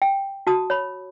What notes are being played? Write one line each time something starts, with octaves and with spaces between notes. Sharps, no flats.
G5
F#4 A5 D#6
C#5 B5